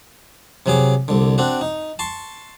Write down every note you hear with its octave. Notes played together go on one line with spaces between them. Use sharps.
C3 F#3 G#4 D6
C2 D3
C4 D4 F#4
D#4
A5 C6 C#6